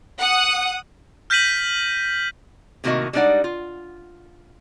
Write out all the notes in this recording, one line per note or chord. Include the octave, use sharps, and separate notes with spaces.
F#5 D#6
F6 G6 A#6 B6 D#7 F#7
A2 C3 D#3 A#3 F#4 D#5
G3 G#3 D4 D#4 D5 F#5
F4